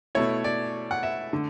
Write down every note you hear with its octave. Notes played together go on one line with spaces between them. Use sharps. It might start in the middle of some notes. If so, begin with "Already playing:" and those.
B2 A3 E4 C#5
D5
F#5
E5
D3 A3